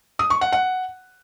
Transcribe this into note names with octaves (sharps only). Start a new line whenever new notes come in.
D#6
C#6
F#5
F#5